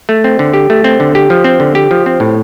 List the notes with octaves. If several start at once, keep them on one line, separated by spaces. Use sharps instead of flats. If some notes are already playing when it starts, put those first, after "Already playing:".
A3
C4
D3
G4
A3
C4
D3
G4
F3
C4
D3
G4
F3
C4
A2